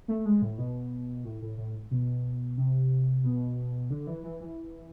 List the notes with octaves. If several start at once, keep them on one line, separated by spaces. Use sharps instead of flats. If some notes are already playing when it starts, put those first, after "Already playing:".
A3
G#3
A2
B2
A2
A2
A2
B2
C3
B2
D3
E3
E3
E3